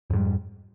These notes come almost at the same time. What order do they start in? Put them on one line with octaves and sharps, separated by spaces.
F2 G#2 G3